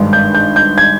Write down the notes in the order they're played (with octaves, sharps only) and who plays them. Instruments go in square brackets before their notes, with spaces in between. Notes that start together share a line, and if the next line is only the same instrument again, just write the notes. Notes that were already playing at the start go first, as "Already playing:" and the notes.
Already playing: [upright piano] G#1 G2 D#3 G#3 D4
[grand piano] G6
G6
G6
G#6